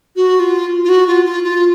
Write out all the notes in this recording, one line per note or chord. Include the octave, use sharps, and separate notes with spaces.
F#4
F4
F4
F#4
F4
F4
F4